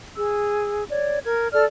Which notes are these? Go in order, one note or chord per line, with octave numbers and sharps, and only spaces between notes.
G#4 E6
C#5 D5
A#4 G#6
A4 D5 F6